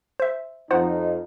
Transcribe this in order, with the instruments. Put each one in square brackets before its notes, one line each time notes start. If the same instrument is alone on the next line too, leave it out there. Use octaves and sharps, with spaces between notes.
[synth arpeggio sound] C5 E5
[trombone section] F2 D#4 [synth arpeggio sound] F4 C5 F#5